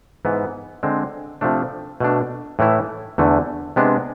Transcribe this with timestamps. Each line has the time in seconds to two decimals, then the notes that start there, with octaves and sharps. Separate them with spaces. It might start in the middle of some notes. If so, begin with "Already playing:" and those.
0.25 G#2 E3 B3
0.83 D3 G#3 C4
1.41 C3 F3 A3 D4
2.00 B2 A3 D4
2.59 A2 E3 A3 E4
3.18 E2 D3 A3
3.76 C3 G#3 B3 D4